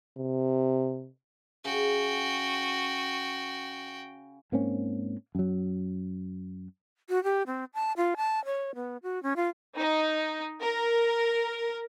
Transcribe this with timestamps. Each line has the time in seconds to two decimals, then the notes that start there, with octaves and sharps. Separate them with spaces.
0.17 C3
1.65 C#3 F#4 G5
4.52 G#2 A#3 C4 C#4
5.35 F#2 F#3
7.09 F#4
7.24 G4
7.47 C4
7.74 A5
7.97 F4
8.17 A5
8.45 C#5
8.75 B3
9.03 F#4
9.23 C#4
9.36 F4
9.77 D#4
10.61 A#4